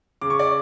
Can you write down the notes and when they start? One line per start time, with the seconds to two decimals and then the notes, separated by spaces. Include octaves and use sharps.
0.21 C#3 D6
0.30 C#6
0.39 D5 D6